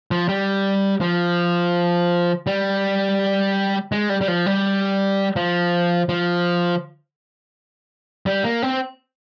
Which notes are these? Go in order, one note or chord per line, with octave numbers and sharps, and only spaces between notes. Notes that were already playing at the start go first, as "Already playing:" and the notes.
F3
G3
F3
G3
G#3
G3
G3
F3
G3
F3
F3
G3
A#3
C4